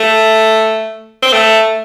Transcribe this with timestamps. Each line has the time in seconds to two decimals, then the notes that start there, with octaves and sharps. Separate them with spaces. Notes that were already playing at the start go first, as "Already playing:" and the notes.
Already playing: A3
1.22 C4
1.33 A3